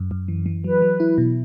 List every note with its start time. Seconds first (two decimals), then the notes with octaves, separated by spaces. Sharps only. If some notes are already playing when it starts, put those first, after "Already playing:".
Already playing: F#2
0.11 F#2
0.28 E3
0.46 E3
0.64 F#3 B4
0.82 F#3
1.00 E4
1.18 B2